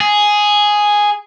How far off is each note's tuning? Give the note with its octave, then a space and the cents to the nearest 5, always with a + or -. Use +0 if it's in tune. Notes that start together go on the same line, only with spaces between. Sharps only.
G#4 +0